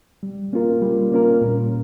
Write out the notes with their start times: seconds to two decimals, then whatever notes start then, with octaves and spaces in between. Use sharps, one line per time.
0.23 G3
0.53 A#3 C#4 F4 A#4
0.82 G3
1.12 A#3 C#4 F4 A#4
1.42 A#2